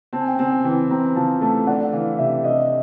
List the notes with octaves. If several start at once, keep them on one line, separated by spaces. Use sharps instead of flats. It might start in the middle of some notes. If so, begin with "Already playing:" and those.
C4 A5
G#5
G5
G#5
C4
G5
E3
C4 A#5
F3 A5
A3 A5
D4 F#5
E3 F5
C3 E5
D4 D#5